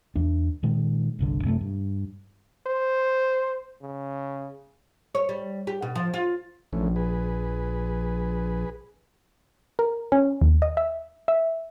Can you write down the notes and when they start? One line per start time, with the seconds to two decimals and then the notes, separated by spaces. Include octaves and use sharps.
0.16 E2 D4
0.63 A#2 D#3 G#3
1.19 G1 C2 D3
1.44 F#2 C3 G#3 A3
1.61 G2
2.67 C5
3.82 C#3
5.15 C#5
5.29 G3
5.67 G4
5.82 B2
5.95 F3
6.14 F4
6.73 A#1 E3 A3 C#4
6.96 G#4 B4
9.79 A#4
10.12 C#4
10.41 D#2
10.62 D#5
10.77 E5
11.28 E5